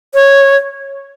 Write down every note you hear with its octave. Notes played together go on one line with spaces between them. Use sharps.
C#5